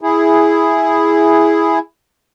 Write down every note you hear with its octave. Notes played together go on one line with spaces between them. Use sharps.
E4 G#4